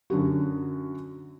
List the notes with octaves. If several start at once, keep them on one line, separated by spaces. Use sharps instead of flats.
F#2 D3 F#3 F#4